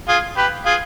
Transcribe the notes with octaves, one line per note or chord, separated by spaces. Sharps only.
F4 G#4
G4 B4
F4 G#4